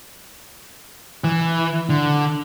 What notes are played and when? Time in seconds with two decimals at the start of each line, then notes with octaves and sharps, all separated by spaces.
1.24 E3
1.89 D3